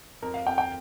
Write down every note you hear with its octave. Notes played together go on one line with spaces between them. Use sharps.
F2 A#4
F5
F2 G5
G5